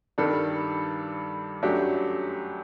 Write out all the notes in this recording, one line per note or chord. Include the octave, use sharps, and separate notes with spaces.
G2 D#3 G3 D4 A4
F#2 F#3 A3 D4 G4